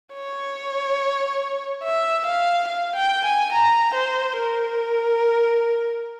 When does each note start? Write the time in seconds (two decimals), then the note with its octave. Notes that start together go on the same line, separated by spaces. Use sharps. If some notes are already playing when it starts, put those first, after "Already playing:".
0.14 C#5
1.84 E5
2.26 F5
2.68 F5
2.95 G5
3.25 G#5
3.52 A#5
3.94 C5
4.37 A#4